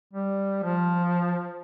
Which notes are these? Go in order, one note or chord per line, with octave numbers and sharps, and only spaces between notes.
G3
F3